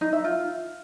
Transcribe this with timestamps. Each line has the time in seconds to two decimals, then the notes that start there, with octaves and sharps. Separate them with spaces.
0.01 D#4
0.13 E5
0.24 F4